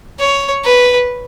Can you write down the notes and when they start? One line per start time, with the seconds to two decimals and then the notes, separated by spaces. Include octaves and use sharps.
0.19 C#5
0.64 B4